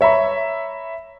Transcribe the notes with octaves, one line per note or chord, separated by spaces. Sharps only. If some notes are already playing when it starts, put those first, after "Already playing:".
C#5 E5 A#5 B5 C#6